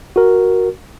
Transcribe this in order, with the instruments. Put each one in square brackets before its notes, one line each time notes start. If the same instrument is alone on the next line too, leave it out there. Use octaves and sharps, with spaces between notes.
[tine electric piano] F#4 A#4